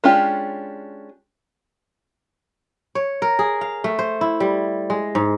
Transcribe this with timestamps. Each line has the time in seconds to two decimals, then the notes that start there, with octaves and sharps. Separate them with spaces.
0.04 G#3 C#4 D4 F4 G4
2.95 C#5
3.22 A#4
3.39 G#4
3.61 F5
3.84 A3
3.99 C5
4.21 E4
4.40 G3
4.90 G#3
5.15 G#2